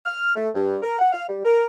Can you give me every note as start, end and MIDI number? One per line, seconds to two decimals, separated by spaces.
0.06 0.35 89
0.36 0.49 57
0.55 0.77 43
0.82 0.96 70
0.99 1.08 78
1.13 1.28 77
1.29 1.40 55
1.45 1.66 70